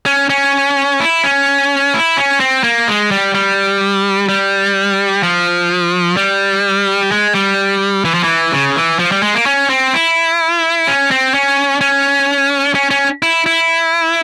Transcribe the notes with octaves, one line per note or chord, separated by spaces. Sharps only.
C#4
C#4
E4
C#4
E4
C#4
C4
A#3
G#3
G3
G3
G3
F3
G3
G#3
G3
E3
F3
E3
C#3
E3
F3
G3
G#3
A#3
C#4
C4
E4
C#4
C4
C#4
C#4
C#4
C#4
E4
E4